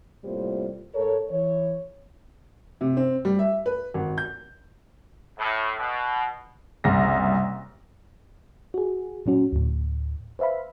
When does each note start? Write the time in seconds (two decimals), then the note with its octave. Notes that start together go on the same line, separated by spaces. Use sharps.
0.24 A2 C3 G3 A#3 F4 C5
0.95 G#2 A4 A#4 C#5
1.30 E3 C#5
2.81 C3
2.97 C4
3.25 G3
3.39 E5
3.66 B4
3.94 G#1
4.18 G6
5.38 A2
5.79 B2
6.84 F#1 C2 A#6
8.74 F#4 G#4
9.26 A#2 F#3 C#4 F#4
9.52 D2 A2
10.39 B4 C5 E5 F5 B5